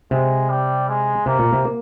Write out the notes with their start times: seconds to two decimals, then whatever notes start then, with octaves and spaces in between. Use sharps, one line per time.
0.11 C3 G#3
0.49 G3
0.88 G#3
1.26 C3 A#3
1.39 A#2
1.53 C3
1.65 A#3